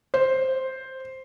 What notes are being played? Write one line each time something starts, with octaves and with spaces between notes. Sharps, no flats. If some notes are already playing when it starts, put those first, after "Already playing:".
C5